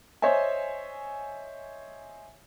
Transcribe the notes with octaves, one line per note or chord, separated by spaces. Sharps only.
C5 C#5 D#5 E5 G#5